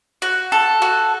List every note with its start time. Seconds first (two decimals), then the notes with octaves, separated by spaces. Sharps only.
0.22 F#4
0.52 A4
0.82 F#4